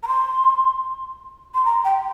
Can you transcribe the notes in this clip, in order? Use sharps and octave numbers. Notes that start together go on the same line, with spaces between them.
A#5
C6
C6
A#5
G5